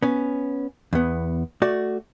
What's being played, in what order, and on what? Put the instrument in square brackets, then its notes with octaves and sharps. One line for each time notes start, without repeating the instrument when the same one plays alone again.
[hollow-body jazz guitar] B3 C#4
E2 B3
A3 F#4 D5